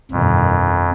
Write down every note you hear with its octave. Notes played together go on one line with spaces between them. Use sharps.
G1 F2 B2 D#3